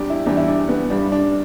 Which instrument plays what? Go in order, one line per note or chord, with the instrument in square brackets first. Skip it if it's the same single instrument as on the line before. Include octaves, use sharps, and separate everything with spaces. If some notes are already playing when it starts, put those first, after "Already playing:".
Already playing: [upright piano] E2 G3 D4 G4
E4
E2 E3 G3 D4
E4
D4
B3
G2 G3 D4
D4